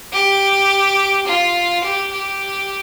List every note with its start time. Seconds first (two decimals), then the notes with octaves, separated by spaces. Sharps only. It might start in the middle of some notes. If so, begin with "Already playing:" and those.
0.13 G4
1.26 F4
1.83 G4
2.12 G4